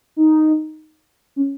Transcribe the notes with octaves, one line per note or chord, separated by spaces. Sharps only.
D#4
C#4